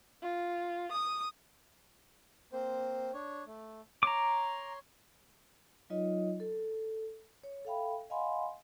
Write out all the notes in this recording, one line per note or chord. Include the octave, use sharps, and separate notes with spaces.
F4
D#6
A#3 C4 C5
D4 C#5
A3
C#5 A#5 C6 D6
F#3 D#4 F4 C#5 D#5
A4
C#5
A4 E5 F5 G5 B5
D#5 F5 F#5 G#5 B5 C6